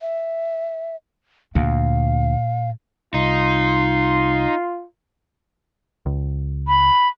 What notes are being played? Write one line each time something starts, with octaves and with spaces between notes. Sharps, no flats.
E5
D2 A#2 F5
C2 D#4 F4 C6
C#2
B5